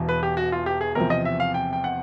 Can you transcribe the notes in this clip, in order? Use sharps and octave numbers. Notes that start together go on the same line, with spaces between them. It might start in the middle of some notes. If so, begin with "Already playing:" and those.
Already playing: E1 E2 B2
B4
G4
F#4
F4
G4
G#4
E2 C3 F3 A#4
D#5
E5
F5
G5
G5
F#5